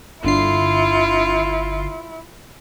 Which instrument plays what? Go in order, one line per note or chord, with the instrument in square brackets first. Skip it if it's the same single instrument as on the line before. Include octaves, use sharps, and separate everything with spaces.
[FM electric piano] G1 D3 C7 [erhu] E4 [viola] F4